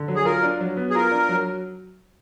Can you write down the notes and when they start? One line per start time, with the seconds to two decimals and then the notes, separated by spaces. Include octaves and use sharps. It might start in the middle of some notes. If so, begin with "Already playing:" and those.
Already playing: D3
0.08 F#3
0.16 G#4
0.25 F4 A#4
0.43 D4
0.61 F#3
0.77 B3
0.90 G#4
0.95 F4 A#4
1.11 D4
1.29 F#3